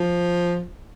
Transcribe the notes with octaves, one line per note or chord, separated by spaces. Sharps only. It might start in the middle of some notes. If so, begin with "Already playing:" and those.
Already playing: F3